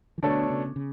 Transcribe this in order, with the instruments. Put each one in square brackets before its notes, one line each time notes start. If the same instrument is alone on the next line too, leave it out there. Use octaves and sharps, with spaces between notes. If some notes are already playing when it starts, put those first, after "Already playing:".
[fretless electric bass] E3
[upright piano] B2 A3 D4 A4 C#5 [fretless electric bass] D3
[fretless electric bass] C#3
C#3